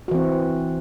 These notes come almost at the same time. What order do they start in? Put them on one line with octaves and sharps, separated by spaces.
F#4 E3 C4